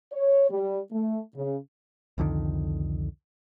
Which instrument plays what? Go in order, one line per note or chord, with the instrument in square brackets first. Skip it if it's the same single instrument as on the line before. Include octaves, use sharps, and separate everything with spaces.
[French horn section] C#5
G3
A3
C#3
[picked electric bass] C2 F2 D3 D#3